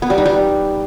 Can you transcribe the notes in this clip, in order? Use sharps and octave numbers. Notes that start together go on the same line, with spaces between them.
B3
G3
D#4
G3